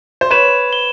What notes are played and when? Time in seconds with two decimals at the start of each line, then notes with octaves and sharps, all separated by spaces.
0.21 C5
0.31 B4 C#5 E7
0.73 G7